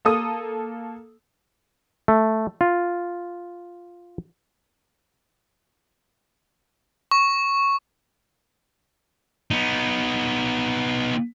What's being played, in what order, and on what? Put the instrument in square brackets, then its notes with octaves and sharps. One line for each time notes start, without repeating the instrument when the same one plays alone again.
[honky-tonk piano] A#3 A4 D#6
[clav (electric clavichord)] A3
F4
[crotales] C#6
[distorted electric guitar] B3 D#4